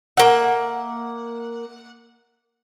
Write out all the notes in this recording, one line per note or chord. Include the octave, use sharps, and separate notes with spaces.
A#3 E5 F#5